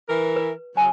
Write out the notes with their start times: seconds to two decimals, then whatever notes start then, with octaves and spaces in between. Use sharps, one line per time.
0.09 E3 A#4
0.36 B4
0.77 C#3 F#3 G#5